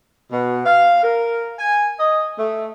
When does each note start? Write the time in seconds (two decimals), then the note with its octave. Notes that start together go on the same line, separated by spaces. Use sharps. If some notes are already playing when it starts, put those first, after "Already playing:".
0.32 B2
0.65 F5
1.02 A#4
1.58 G#5
1.99 D#5
2.38 A3